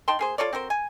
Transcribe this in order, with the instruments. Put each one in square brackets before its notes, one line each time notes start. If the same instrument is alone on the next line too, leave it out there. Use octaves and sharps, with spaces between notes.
[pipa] D#4 G5 A5 C6
A#3 G#4 C5
F4 A4 C#5 D5
C4 F#4 A#4 C5
G#5